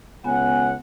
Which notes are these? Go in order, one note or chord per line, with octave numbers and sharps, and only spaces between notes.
C#2 B3 C#4 F#5 G#5